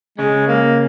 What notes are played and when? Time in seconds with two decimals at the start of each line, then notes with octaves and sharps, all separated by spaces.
0.18 C#3 G#3 C#4
0.47 A#3